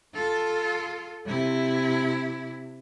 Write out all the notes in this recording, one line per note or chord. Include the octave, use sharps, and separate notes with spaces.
F4 A4
C3 E4